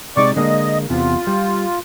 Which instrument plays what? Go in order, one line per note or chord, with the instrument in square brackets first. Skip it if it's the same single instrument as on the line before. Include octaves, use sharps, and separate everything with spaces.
[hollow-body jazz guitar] C3 G#3 D#4 [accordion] D5 C#6 D6
[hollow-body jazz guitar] D3 G#3 A#3 [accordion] D#5
[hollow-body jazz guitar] E2 C3 E3 [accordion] F4
[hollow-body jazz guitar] G3